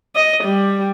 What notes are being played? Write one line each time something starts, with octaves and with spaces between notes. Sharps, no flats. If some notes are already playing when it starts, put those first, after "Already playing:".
D#5
G3